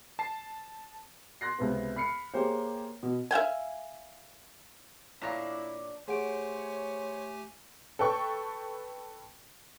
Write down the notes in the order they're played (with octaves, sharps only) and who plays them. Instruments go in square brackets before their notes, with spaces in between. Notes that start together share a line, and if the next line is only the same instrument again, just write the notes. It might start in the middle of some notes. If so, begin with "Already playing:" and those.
[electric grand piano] A5 C7
[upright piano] C6 F#6 A#6 C7
C#2 C3 B3
B5 F6 C7 C#7
A#3 G4 G#4 C5 C#5
B2
[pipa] E5 F5 G5 G#5
[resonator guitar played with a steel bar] A#2 C#5 F5 [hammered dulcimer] D4 [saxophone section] E4 [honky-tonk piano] D6 A#6 B6
[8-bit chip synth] A3 G4 G#5 [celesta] G#4 F#5 D7 [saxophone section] C5 C#5
[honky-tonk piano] A4 B4 G5 C#6